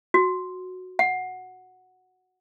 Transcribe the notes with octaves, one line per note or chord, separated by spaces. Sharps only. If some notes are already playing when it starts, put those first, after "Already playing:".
F#4
F#5